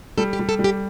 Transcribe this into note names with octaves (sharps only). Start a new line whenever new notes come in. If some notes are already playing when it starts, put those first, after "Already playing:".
G3 A4
G4
G3
A4
G3
G4